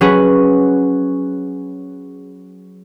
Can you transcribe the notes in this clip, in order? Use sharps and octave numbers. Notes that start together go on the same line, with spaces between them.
F#3 C#4 G#4 B4